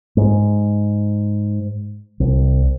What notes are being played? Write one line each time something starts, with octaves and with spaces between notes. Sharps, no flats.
G#2
C2